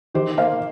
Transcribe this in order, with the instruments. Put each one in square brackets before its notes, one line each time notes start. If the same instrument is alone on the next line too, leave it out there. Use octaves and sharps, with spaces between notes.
[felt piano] D#3 G4 C5
A#3 C5 F5